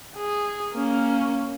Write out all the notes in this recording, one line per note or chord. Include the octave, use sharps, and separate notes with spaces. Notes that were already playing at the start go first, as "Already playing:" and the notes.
G#4
A#3 C#4